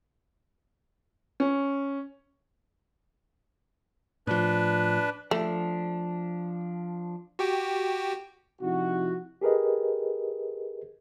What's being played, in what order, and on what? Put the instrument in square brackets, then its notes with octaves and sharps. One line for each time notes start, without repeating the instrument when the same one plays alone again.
[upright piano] C#4
[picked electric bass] A2 F3 [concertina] D4 B4
[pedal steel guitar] F3 D4 [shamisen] A3
[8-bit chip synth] F#4 G4 G5
[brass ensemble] C3 F3 D#4 E4 F#4
[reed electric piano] G4 G#4 A#4 B4 D#5